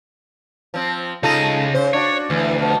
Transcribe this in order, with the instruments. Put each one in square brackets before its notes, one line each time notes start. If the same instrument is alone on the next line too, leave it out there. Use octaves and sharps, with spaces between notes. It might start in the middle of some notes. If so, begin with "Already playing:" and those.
[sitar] F3 C4
[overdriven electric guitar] C#3 D#5 [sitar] D#4 F4 A4
[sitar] C#3 C5
[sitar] D4 F#4 [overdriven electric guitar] C#5
[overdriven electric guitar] D2 [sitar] E3
[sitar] B2 F3